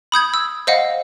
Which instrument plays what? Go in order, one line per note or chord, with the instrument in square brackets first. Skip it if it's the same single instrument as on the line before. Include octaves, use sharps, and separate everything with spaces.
[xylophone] B5 D#6 G6 G#6
E6
C5 D#5 F5 F#5